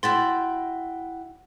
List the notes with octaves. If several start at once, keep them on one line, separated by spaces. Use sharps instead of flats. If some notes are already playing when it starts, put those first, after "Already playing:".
E4 F#4 G5 C6 A6